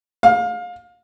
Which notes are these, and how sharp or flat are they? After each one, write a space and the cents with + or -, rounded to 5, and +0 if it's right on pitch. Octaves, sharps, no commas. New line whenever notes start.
F5 +25